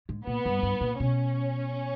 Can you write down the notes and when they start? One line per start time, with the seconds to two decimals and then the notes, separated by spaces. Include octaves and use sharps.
0.09 G#2
0.26 A#2 B3
0.45 G2
0.63 G2
0.81 A#2
1.00 B2 C#4